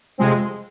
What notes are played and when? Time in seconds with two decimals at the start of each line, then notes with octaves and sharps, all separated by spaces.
0.18 F2 C3 F3 G#3 C4